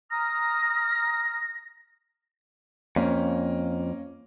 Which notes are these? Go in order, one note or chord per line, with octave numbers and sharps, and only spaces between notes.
A#5 D#6 F6 A#6
F2 A#3 C#4